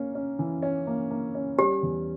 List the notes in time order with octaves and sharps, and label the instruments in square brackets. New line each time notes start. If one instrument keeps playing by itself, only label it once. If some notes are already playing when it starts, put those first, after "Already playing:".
Already playing: [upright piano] A#3 C#4
C#4
E3
C#4
A#3
A#3
C#4
[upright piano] G3 [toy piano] G4
[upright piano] E2